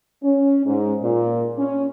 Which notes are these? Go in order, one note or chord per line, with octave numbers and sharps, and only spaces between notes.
C#4
G#2
A#2
C#4